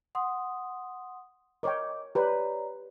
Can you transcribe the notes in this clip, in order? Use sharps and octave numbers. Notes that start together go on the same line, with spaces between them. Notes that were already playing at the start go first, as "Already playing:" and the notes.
F#5 C6 D#6
A#4 C#5 D#5 G5 D6
G4 B4 C#5 D5 A#5